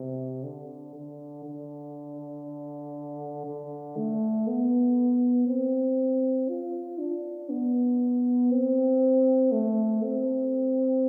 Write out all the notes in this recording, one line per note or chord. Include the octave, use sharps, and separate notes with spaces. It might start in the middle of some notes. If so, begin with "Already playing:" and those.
Already playing: C3
D3
D3
D3
D3
A3
B3
C4
F4
D4
B3
C4
A3
C4